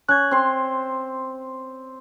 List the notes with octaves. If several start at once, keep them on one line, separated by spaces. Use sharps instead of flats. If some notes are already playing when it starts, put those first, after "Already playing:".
C#4 F#6 G#6
C4 C6